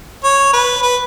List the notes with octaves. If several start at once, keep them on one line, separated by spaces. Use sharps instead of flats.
C#5
B4
B4